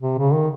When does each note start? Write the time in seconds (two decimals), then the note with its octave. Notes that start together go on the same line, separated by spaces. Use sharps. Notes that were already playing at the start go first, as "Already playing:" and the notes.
0.01 C3
0.18 C#3
0.33 D#3